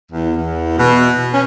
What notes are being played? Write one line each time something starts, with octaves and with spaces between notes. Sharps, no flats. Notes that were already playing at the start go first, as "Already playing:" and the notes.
E2
E2
B2
C#4